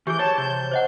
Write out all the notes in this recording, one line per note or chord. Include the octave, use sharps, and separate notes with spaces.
E3 G4 G#4 G6
C#5 A5
C3 G6
C5 D#5 F#5